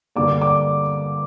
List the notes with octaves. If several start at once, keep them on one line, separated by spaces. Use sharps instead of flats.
G2 D3 G3 A#3 D5 D6
D5 D6